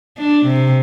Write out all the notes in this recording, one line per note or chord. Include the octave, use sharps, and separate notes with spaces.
D4
C3